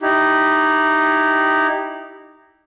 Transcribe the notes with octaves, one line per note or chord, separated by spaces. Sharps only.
D#4 E4 G4